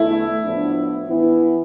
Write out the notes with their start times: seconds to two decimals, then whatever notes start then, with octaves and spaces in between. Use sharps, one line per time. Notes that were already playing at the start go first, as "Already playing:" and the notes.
Already playing: E2 D3 A3 E4
0.43 A2 F3 B3 D4
1.09 E3 B3 E4